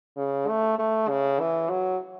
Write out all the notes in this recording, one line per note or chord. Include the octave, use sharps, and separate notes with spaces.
C#3
A3
A3
C#3
E3
F#3